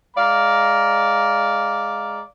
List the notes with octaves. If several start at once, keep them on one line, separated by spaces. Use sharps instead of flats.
G#3 D5 F5 A#5